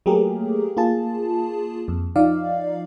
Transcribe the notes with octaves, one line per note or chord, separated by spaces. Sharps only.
F#3 A3 A#3 G4 G#4 A#4
A#3 F4 G#4 A5
F2
F3 D#4 D5 F5